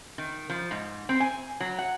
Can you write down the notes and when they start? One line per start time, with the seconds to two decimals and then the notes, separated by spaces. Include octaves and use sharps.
0.18 D#3
0.50 F3
0.71 G#2
1.09 C4
1.20 G#5
1.60 F#3
1.78 F#5